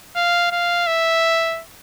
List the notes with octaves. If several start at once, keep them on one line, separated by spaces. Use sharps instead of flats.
F5
F5
E5